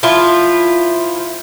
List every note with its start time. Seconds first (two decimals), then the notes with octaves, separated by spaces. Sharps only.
0.03 F3 E4 F4